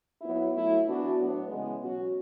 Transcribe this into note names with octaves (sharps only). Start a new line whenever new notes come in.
F#3 B3 E4
F#3 A3 E4
E3 B3 D4 F#4
A2 F#3 B3 D4
C#3 E3 G#3 B3
B2 F#3 C#4 F#4